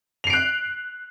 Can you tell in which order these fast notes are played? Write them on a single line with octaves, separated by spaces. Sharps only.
F7 C7 D7 F#6